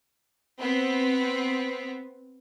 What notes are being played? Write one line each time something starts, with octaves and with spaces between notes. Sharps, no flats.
B3 C4